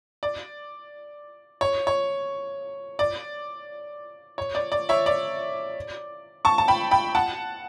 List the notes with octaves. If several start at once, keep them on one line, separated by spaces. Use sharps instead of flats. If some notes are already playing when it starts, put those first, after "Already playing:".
D5
C#5
C#5
D5
C#5
D5
D5
C#5 E5
D5
A5 C#6
A5
G5 B5
G5 B5
F#5 A5